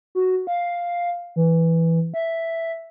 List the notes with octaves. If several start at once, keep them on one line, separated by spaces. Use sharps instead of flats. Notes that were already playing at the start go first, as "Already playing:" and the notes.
F#4
F5
E3
E5